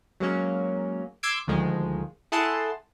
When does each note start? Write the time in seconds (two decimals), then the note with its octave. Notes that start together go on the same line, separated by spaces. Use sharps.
0.20 F#3 G#3 A#3 C#4
1.23 C6 D6 E6 G#6 C7 D7
1.47 D2 D#3 F3 G#3
2.32 E4 G#4 A4 F#5 A5 C6